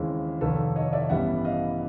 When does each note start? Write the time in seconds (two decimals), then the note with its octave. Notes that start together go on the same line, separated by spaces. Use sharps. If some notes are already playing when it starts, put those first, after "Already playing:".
Already playing: D#2 C#3 E3 G#3 C4
0.41 F1 D#2 D#3 A4 B4
0.76 C#5 D#5
0.93 D5 E5
1.10 A1 G2 E3 G3 B3 E5 F#5
1.45 D#5 F5